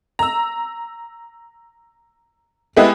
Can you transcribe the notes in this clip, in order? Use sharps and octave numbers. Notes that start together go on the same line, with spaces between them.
A#5 E6
G#3 A3 B3 E4 G4